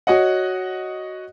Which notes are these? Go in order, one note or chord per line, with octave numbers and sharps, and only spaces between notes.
F#4 C#5 D#5 F#5